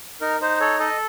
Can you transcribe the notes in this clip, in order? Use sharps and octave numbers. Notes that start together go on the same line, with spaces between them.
D#4 A#4
D#4 C5
A4 C#5
A4 D#5